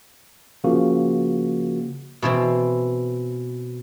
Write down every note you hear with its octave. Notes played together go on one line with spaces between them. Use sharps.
C#3 F3 A#3 F#4
B2 E3 C4